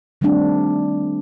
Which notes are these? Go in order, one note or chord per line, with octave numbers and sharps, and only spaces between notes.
D#3 G3 A3 C4 D4